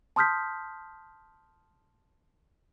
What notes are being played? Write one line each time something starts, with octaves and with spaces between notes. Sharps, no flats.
A5 C6 D#6 F6 G6 B6